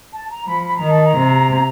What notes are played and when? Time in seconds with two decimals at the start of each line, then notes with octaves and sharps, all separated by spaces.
0.12 A5
0.30 A#5
0.46 F3 B5
0.65 B5
0.77 D#3 A#5
0.90 A5
1.04 A#5
1.16 C3